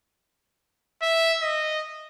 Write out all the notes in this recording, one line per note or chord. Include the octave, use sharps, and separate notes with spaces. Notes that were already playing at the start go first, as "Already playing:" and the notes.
E5
D#5